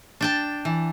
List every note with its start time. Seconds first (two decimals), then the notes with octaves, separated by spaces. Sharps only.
0.21 D4 G5 A5
0.65 E3